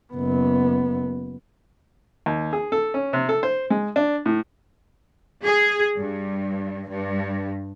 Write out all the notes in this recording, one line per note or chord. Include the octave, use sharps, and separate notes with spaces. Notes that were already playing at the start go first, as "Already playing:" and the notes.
F#1 B3
D#2
G#4
A4
C#4
C3
A4
C5
G#3
D4
A2
G#4
G2
G2